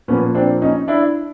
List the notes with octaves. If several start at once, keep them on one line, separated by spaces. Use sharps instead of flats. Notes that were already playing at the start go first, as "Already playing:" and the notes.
A#2 F3 A#3 B3 C#4
C4 D4
C#4 D#4
D4 E4